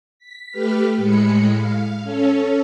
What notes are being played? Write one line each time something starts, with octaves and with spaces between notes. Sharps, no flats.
B6
A3 G4 B4 F6 B6
A2 G#3 B5 C#7
F5
C#4 A4 C#5